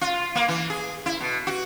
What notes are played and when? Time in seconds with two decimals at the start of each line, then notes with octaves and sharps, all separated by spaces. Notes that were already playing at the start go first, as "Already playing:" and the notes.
0.01 F4
0.35 A#3
0.48 E3
0.70 G#4
1.06 E4
1.20 B2
1.47 F#4